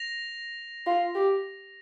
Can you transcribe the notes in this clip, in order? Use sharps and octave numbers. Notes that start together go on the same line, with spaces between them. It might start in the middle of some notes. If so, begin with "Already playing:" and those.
Already playing: A#6 F7
F4
G4